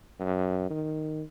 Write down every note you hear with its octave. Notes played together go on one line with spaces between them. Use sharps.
F#2
D#3